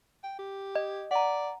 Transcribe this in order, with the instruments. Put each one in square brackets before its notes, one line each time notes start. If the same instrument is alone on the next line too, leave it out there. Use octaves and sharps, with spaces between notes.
[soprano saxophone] G5
G4
[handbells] D#5
[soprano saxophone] D5 [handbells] F#5 A#5